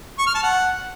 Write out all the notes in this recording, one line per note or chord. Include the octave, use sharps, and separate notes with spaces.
C#6
F6
A5
F#5